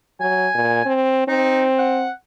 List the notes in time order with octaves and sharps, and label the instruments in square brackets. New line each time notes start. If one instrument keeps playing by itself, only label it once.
[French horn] F#3 [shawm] G#5
[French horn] A#2
C4
[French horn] C4 [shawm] D#4
[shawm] F#5